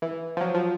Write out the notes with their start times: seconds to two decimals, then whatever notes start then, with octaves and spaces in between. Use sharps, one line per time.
0.02 E3
0.37 F3
0.41 F#3
0.54 F3